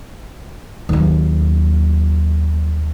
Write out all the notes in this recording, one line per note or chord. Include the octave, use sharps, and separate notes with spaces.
D#2 F#3